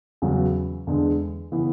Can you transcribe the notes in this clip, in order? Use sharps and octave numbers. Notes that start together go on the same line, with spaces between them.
E2 C#3 F#3
E2 D3 G#3
C#3 E3 B3 E4